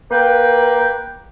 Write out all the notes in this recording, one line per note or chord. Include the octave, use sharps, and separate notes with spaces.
A#3 B4 G5